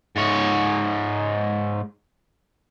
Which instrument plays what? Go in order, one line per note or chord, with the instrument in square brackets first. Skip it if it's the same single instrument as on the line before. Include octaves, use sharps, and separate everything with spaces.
[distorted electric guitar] G#2 C#5